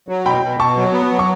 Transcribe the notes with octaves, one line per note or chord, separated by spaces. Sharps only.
F#3
B2 G5 B5
B2
B2 A5 C#6
F#3
B3
F#3
C#6